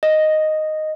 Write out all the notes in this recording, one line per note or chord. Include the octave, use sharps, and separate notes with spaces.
D#5